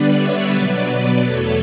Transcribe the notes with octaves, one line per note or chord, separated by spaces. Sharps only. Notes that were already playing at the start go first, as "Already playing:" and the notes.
Already playing: D3 G3 B3 D4 B4 D5
C#5 E5
B2 F#3 B3 B4 D5
E2 B2 A3 A4 C#5